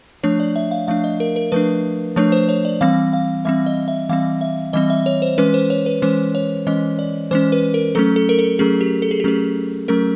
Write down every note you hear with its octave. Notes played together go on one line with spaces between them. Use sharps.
F3 A3 D4 C#5
D5
E5
F5
F3 A3 D4 F5
D#5
A#4
A#4
F3 A3 D4 B4
F3 A3 D4 C#5
C5
C#5
D5
E3 G3 C4 F5
F5
E3 G3 C4 E5
D#5
E5
E3 G3 C4 F5
E5
E3 G3 C4 D#5
E5
C#5
C5
E3 G#3 C#4 B4
C5
C#5
B4
E3 G#3 C#4 C5
C#5
E3 G#3 C#4 D#5
D5
E3 G#3 C#4 C5
B4
A#4
F#3 A3 C#4 A4
A4
A#4
A4
F#3 A3 C#4 G#4
G4
A4
G#4
G4
F#3 A3 C#4 G#4
F#3 A3 C#4 A#4